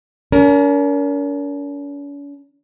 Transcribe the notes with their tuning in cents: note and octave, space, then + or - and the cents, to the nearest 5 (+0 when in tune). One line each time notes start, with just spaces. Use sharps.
C#4 +45 A#4 +5